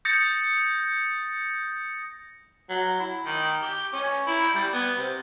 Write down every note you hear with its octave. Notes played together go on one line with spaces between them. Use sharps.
D#6 G6 A6 A#6 C#7
F#3
E4
D#3
G4
C#4
E4
G3
B3
C3